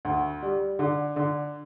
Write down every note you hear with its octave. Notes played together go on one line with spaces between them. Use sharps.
D2
G3
D3
D3